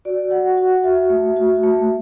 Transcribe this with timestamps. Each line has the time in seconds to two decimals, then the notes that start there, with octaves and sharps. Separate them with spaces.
0.05 F#4 D5
0.31 F#4 F#5
0.57 F#4 F#5
0.83 F#4 E5
1.10 A3
1.36 F#4
1.63 A3